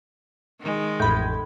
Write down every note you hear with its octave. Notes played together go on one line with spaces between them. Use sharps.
D#3 G#3
A1 F2 A2 B5 G6 G#6